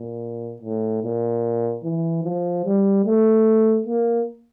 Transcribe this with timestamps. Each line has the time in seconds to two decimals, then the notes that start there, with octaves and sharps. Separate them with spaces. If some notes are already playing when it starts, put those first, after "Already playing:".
Already playing: A#2
0.61 A2
1.03 A#2
1.83 E3
2.24 F3
2.65 G3
3.05 A3
3.86 A#3